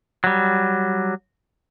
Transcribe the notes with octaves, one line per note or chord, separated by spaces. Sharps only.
F#3 G3